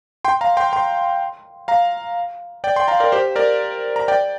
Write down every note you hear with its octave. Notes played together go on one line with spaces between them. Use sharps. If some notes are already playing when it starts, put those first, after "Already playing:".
G5 C6
F5 A#5
G5 C6
G5 C6
F5 A#5
D5 G5
G5 C6
F5 A#5
A#4 D5
G4 C5
A#4 D5
A#5
D5 G5